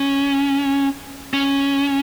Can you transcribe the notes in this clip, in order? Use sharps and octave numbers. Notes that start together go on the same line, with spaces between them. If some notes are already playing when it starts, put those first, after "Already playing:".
Already playing: C#4
C#4